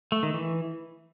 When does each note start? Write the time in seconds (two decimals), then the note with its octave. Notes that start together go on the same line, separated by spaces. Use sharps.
0.12 A3
0.23 D#3
0.34 E3